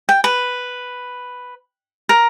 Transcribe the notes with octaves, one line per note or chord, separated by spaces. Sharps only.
G5
B4
A#4